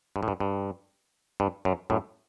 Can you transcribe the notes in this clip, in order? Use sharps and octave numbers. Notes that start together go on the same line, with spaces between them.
G2
A2
G2
G2
G2
F#2
F#2 A2